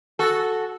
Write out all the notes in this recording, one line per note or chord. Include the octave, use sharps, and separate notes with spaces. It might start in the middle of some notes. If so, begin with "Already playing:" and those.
F#4 A4